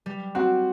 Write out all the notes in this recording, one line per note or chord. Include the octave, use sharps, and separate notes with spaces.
G3
C4 F#4